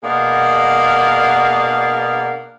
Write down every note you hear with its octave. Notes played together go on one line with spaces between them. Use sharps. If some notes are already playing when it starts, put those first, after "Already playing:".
B2 A#3 D4 G#4 F5 F#5